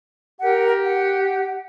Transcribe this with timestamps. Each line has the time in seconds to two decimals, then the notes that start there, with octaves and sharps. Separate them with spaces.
0.40 G4 A#4 F#5
0.85 F#5